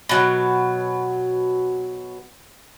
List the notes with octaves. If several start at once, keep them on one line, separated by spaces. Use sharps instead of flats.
B2 F#3